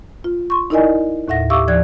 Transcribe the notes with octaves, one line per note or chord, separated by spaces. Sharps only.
F4
C6 C#6
D#4 E4 A#4 D5 D#5 G#5
D#2 A2 E5 F#5 A#6
G4 E5 F5 C#6 D6 E6
D#2 F3 D5 F#6 G#6